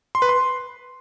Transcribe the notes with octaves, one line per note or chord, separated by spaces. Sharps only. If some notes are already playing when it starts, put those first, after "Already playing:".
C6
B4
C6